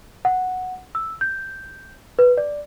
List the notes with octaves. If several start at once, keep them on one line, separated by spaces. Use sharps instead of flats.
F#5
E6
G6
B4
D5